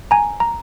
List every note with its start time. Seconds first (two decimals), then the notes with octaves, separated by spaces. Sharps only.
0.11 G#5 A#5
0.40 A#5